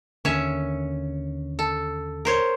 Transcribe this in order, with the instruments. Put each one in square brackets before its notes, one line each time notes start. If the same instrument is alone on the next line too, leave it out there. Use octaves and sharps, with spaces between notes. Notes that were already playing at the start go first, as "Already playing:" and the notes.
[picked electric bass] D#2 D3 [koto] C#4 C#5 E5
[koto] A4
A#4 C5 C#5